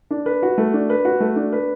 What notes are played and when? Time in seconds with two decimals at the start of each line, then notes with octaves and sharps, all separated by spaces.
0.11 D4
0.26 B4
0.43 F#4
0.58 A3
0.74 D4
0.90 B4
1.05 F#4
1.20 A3
1.36 D4
1.52 B4